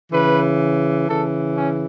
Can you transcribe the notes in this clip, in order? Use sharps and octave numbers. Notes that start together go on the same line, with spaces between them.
C#3 E3 B4
C#3 E3 A4
C#4